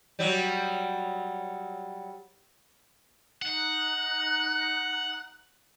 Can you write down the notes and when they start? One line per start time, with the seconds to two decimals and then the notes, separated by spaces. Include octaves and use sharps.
0.19 F#3 G3
3.42 D#4 F#5 F#6